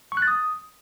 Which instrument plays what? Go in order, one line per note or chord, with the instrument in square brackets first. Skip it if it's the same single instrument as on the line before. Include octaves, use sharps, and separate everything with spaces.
[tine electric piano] C#6
F#6
A6
D#6